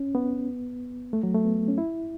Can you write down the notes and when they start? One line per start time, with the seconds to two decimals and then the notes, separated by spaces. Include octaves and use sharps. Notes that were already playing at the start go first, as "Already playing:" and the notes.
Already playing: C#4
0.15 B3
1.13 A3
1.23 F#3
1.34 A3
1.45 B3
1.68 C#4
1.78 E4